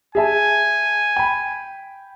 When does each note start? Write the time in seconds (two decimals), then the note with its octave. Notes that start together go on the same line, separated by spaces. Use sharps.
0.15 G#4 E5 G#5 A5
1.16 G5 B5